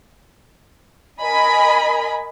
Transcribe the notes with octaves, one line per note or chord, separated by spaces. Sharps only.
A#4 D#5 G#5 B5